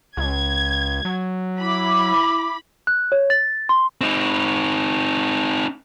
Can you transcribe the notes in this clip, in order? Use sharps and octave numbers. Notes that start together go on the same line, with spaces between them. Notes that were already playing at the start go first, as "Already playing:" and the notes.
C#2 G#6
F#3
E4 B5 D6
F#6
C#5
A6
C6
C4 D#4